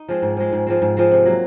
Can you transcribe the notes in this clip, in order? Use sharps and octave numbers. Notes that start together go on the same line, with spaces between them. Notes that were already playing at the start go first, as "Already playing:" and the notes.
Already playing: D#4
F3 G#3 C4
G#2
F3 G#3 C4
G#2
F3 G#3 C4
G#2
F3 G#3 C4
C3
F#3 A#3